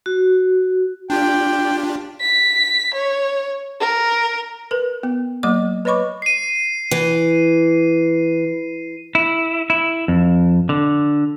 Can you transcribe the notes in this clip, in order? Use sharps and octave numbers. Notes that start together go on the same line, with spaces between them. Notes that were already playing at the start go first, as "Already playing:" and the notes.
F#4
D4 F4 G4 G5
B6
C#5
A#4
A#4 B4
B3
F#3 A#3 D#5 D6
B4 C#5 D#5 B5 C#6 D6
C7 D#7
E3
E4
E4
F2
D3